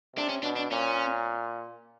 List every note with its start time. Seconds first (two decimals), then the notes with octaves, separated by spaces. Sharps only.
0.15 C3 D4
0.29 C#4
0.42 B2 D4
0.56 D4
0.71 A#2 C#4